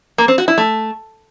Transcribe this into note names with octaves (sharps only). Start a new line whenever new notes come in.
A#3
C4
F#4
E4
A3